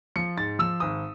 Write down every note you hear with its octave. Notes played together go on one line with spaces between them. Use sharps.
F3 C#7
G#2 A6
F3 E6
G#1 D#6